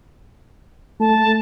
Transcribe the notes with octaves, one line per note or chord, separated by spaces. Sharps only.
A3 A5